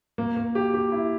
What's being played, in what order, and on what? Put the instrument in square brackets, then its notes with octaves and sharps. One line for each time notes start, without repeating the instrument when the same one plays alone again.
[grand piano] A#3
A#3
G4
G4
E4